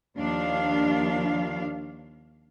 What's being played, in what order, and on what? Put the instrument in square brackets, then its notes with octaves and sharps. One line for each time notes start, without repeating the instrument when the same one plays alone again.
[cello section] D#2 F3 D4 F5